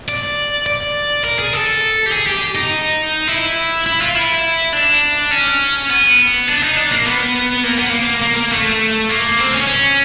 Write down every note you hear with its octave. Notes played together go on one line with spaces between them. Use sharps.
D5
D5
A#4
G#4
A4
G4
G#4
G4
D#4
E4
E4
F4
E4
D4
C#4
B3
D4
D#4
D4
A#3
B3
A#3
B3
A#3
A#3
A#3
A3
A#3
C4
C#4
C#4